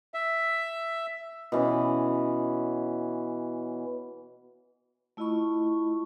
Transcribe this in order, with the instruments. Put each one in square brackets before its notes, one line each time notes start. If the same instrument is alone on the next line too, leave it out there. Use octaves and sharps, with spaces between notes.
[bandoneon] E5
[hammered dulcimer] B2 E3 C#4
[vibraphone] A3 E4 F4 D#5 B5 C#6